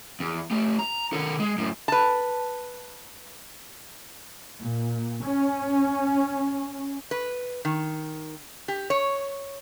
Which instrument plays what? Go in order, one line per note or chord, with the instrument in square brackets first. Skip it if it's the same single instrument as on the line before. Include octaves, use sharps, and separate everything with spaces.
[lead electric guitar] E2
A3 G4
A#5
D#3 A4
G#3
F#2 A2
[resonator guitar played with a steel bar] B4 A5
[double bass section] A#2
C#4
[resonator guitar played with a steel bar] B4
D#3
G4
C#5